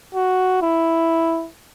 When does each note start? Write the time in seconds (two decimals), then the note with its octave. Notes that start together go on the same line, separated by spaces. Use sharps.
0.15 F#4
0.62 E4